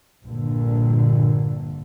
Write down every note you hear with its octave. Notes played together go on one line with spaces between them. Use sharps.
A#1 G2 A#2 D3